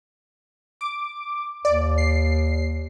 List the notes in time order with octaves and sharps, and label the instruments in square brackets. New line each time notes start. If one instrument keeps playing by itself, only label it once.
[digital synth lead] D6
[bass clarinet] D#2 [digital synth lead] D5
[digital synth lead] C7